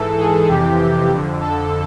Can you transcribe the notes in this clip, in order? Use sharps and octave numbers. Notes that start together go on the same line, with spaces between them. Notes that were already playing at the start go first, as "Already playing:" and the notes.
Already playing: G#2 E3 A4
G#4
F2 C3 E3 G4
F2 D3
A4